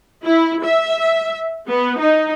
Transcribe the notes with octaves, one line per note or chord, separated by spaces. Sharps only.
E4
E5
B3
D#4